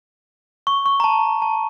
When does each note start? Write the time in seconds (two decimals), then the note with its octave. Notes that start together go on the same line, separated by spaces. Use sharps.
0.67 C#6
0.86 C#6
1.00 A#5
1.04 A5
1.42 A5